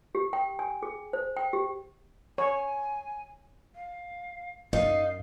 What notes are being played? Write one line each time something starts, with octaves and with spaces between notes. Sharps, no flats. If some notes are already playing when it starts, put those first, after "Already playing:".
G4
G5
G#5
G#4
C5
G5
G4
C#5 G#5
F5
F#2 D#4 F5